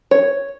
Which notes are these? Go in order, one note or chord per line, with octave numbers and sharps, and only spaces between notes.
C#5